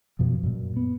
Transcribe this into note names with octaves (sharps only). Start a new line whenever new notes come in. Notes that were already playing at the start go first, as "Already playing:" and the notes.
F#2 B2 F3
F#2 A#2
B3